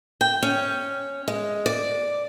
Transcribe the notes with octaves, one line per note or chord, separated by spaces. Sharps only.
G5
C#4
G#3
D5